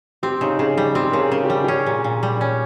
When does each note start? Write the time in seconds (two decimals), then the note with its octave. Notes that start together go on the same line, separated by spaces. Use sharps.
0.23 C4 G4
0.41 C#3 D#4
0.59 C#3 G#4
0.77 G3 G#4
0.95 C4 G4
1.12 C#3 A#4
1.19 G#4
1.32 C#3
1.44 G4
1.50 G3
1.64 G4
1.68 C#4 G#4
1.86 A#2
2.04 A#2
2.23 G3
2.41 C#4